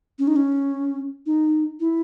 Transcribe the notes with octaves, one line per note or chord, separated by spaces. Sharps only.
C#4
D#4
C#4
D#4
E4